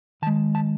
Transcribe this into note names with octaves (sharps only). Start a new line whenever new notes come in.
D#3 G#3 A5
A5